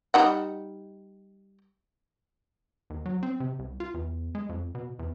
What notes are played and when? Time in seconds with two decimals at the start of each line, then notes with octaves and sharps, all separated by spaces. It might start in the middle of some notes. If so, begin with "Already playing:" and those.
0.14 G3 D#4 F#5
2.90 D#2
3.06 F#3
3.23 C4
3.40 C3
3.59 C2
3.80 F4
3.94 E2
4.35 G#3
4.49 F2
4.75 B2
4.99 E2